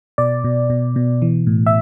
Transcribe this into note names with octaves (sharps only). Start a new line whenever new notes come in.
B2 D5
B2
B2
B2
E3
A2
E5